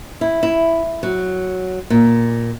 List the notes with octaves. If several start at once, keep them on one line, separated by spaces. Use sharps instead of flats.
E4
E4
F#3
A#2